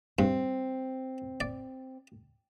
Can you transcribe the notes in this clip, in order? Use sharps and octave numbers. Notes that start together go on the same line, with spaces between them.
G2 C4
D5